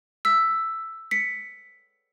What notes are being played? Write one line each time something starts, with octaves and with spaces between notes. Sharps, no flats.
E6 B6
B6 C#7